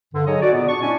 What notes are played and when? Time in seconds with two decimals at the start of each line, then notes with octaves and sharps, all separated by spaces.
0.14 G2 D3
0.27 F#3 D#4 G#4 C#5 D#5
0.42 F#4 D5
0.53 A#2 B3
0.67 D4 C#6
0.81 C#4 D4 E4 D5 G#5